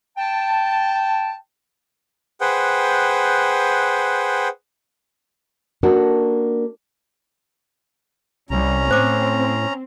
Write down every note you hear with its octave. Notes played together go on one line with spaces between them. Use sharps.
G5 A5
G#4 B4 C5 F#5 G5
A#3 C#4 D4 F#4 A4 A#4
C2 G3 C#4 A#5
A2 C4 C5 D6